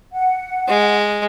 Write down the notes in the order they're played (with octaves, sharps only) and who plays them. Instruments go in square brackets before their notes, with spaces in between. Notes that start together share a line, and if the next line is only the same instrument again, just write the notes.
[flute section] F#5
[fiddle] G#3